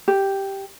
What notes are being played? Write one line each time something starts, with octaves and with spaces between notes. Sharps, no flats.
G4